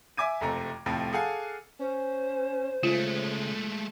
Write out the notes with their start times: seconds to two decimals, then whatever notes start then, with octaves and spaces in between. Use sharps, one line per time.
0.17 E5 G#5 D6 G#6 D#7
0.41 F#1 F2 C3 A3 A#5
0.86 F2 A2 C3 F3
1.13 G#4 A4 F5 F#5 G#5
1.79 C#4 C5
2.83 C#3 G#3 A3 F4